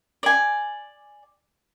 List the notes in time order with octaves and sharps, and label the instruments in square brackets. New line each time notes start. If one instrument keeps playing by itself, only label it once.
[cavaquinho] D5 G#5